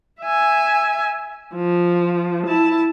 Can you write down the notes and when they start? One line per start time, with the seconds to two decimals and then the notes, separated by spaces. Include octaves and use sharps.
0.22 E5 G#5
1.55 F3
2.47 E4 A5